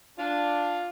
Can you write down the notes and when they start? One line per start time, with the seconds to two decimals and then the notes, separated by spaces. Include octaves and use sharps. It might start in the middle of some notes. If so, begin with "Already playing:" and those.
0.18 D4 F4